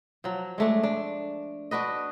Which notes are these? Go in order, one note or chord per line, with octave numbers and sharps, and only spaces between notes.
F3 F#3
G#3 A3 D4
D4
D4 F#4 B4 D#5